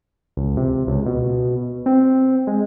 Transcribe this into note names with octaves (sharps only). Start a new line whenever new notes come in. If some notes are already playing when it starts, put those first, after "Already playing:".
C#2
C3
C#2
B2
C4
G#3